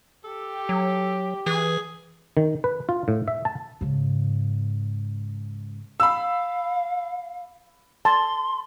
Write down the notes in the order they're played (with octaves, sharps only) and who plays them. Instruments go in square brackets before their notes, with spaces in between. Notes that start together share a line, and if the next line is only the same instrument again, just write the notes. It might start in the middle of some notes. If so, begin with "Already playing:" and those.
[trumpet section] G4 [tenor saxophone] A4
[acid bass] F#3
[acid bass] E3 [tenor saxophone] G#4
[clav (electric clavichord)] D#3
B4
F4
A2
E5
A5
[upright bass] G#2 C#3
[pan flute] F5 [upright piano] B5 E6
[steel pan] A5 [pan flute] C6